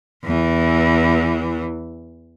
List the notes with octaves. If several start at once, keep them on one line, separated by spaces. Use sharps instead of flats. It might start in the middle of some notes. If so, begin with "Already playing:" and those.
E2 E3